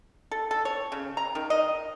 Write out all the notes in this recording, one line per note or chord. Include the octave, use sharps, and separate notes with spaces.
A4
A4
C#5
C#3
A#5
D#3
D#5